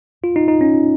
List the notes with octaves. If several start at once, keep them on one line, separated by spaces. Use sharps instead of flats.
F4
D#4
D#4
C#4